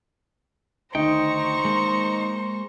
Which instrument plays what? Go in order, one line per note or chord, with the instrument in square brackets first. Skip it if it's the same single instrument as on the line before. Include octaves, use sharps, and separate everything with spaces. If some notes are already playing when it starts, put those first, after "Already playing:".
[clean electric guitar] D2 G5 [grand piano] D#3 D#4 [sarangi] C5 [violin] A#5 C#6
[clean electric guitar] G#3 A#3